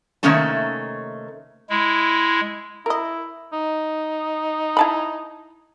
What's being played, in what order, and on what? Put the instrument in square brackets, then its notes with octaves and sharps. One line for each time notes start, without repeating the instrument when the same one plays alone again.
[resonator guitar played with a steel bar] C3 D#3 A3 A#3 C#4 A5
[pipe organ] G#3 E4
[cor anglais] E4 [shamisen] A#4 D#5
[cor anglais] D#4
[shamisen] E4 A5 B5